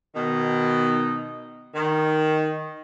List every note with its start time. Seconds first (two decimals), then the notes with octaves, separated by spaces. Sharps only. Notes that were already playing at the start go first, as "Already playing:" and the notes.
0.14 B2 D#3 D#4
1.74 D#3